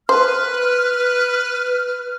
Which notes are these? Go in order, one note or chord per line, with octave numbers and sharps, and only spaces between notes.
B4 C5 F6